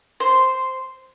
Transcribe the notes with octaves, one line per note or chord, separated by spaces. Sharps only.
C5